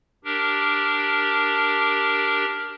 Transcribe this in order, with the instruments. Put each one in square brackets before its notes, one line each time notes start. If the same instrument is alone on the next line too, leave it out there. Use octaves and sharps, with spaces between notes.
[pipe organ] D4 G4 A#4